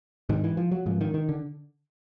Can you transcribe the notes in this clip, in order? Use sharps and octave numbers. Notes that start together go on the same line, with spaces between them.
G#2 D#3
E3
F3
F#3
G#2 F3
D#3
D#3
D3